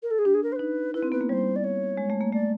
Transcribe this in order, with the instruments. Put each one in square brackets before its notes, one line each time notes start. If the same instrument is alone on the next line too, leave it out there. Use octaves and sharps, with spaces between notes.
[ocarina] A#4
A4
G#4
[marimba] D4 [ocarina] G4
[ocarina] G#4
A#4
C5
[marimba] D#4 [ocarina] B4
[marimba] E4 [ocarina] B4
[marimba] C4
[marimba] B3 [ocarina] B4
[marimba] A#3
[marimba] G3 [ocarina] C5 C#5
[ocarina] D5
C#5
[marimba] G#3
A3
A#3
[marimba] A3 [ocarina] D5